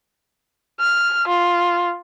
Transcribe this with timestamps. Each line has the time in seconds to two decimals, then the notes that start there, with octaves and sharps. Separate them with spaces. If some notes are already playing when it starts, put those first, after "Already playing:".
0.80 F6
1.28 F4